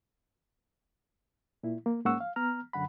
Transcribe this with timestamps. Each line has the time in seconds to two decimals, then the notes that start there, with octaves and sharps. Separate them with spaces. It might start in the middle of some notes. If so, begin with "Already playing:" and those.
1.63 A#2 E4
1.86 A#3
2.05 G#2 A#3 C#4 F#5 C#6 E6
2.20 F5
2.36 B3 A#5 F6
2.73 F#2 D3 F#5 B5